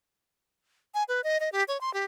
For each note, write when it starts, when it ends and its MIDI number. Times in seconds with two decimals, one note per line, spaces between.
0.94 1.03 80
1.08 1.21 71
1.24 1.38 75
1.40 1.49 75
1.52 1.64 67
1.68 1.80 73
1.81 1.93 84
1.94 2.05 67